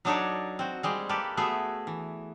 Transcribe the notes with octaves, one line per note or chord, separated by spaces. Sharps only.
F#3 D4 D#4 A4 C#5 D5
C4 F#4
G3 G#3 C4
A#3 G4 A4 B4 D5
A3 B3 F#4 G#4 E5
E3